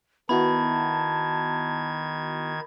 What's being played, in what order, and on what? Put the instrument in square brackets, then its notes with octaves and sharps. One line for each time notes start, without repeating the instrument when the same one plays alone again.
[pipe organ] D#3 G#6 [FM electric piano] B3 E4 F#4 [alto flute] A5 [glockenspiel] B5